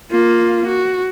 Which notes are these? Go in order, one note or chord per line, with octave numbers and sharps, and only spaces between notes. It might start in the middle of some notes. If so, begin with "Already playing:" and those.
A#3 F4
F#4